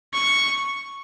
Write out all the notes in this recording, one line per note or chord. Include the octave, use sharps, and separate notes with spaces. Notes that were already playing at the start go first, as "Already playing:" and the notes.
C#6